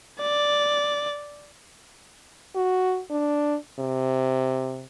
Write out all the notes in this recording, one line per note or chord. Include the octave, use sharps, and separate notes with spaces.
D5
F#4
D4
C3